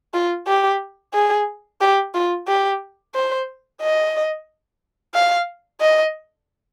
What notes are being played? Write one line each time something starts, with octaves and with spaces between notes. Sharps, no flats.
F4
G4
G#4
G4
F4
G4
C5
D#5
F5
D#5